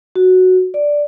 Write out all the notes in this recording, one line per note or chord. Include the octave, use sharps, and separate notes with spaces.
F#4
D5